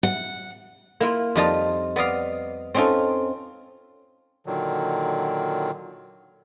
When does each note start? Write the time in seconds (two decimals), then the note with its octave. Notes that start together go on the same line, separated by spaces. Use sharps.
0.03 F#5
1.00 A#3 E4 F4
1.35 F2 G3 D#4 F4 D#5 A5
1.96 B3 D5 D#5 F5
2.75 C4 C#4 D#4 F4 A4
4.46 A#2 D3 D#3 F#3